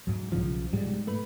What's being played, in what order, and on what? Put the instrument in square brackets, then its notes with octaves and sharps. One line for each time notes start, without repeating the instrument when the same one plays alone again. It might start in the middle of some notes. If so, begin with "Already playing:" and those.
[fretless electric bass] G#2 F#3
[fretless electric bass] B1 C#3 [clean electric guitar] F3
[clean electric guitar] B1 G3 G#3 [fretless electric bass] G#2
[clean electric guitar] A3 B4